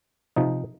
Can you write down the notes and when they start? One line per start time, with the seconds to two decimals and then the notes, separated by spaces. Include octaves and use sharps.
0.36 C3 F3 D#4